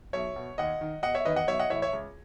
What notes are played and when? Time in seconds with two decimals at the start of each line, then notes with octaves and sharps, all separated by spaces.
0.13 B1 C#5 E5
0.36 B2
0.58 D#2 D#5 F#5
0.81 D#3
1.03 E1 D#5 F#5
1.14 C#5 E5
1.25 E2 D#3 B4 D#5
1.36 D#5 F#5
1.48 B1 C#5 E5
1.60 D#5 F#5
1.70 A2 E3 C#5 E5
1.82 C#5 E5
1.93 C#2